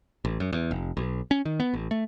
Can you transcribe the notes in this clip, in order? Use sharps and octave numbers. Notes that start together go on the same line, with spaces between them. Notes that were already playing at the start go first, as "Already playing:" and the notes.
A1
F#2
E2
F1
B1
C#4
D#3
B3
A1
A3